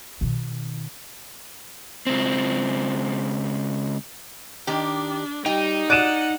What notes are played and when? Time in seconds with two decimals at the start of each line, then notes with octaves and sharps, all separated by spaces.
0.21 B2 D#3
2.07 C#2 C4
4.67 D#3 D4 G4
5.46 G3 D#4 G5
5.90 D5 F#5 F#6 D#7 E7